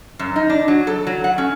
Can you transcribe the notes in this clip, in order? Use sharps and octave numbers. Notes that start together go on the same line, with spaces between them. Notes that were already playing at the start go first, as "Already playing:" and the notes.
F#2
D#4
D4
F#3
A4
F#3
F#5
C#4